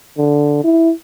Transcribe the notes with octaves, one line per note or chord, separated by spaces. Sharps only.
D3
E4